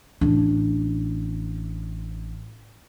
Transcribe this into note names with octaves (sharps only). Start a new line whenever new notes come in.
A1 D4